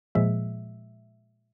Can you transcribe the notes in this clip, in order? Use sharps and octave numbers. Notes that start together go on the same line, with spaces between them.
A#2 F3 G#3 E5